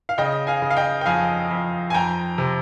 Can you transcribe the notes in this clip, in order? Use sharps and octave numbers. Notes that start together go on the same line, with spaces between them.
F5
C#3 D#5 G5
F5 G#5
C#3
F5
D#5 G5
G5
F2 F5 G#5
F2
G#5
F2 G5 A#5
C3